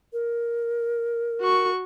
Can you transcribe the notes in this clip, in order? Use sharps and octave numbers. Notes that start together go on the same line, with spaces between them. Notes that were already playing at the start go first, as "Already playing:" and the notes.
A#4
F#4 C#6